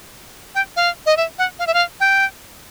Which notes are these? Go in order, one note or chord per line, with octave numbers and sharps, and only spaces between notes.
G5
F5
D#5
E5
F#5
F5
E5
F5
G5